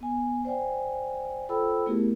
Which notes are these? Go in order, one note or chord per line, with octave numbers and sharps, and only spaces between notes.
B3 G#5
C5 D5 G5 G#5
F4 A4 C5 G5 B5 E6
A3 B3 E4 G4 G#4 A#4